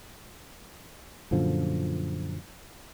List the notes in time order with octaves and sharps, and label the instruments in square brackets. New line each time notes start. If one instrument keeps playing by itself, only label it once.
[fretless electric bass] F#2 A#2 D3 F3